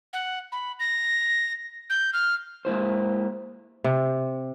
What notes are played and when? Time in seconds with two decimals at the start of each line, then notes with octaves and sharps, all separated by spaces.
0.13 F#5
0.52 B5
0.80 A#6
1.90 G6
2.13 F6
2.65 G#3 A#3 E4 C5
3.84 C3